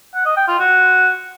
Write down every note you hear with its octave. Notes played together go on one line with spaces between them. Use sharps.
F#5
D#5
G5
F4
F#4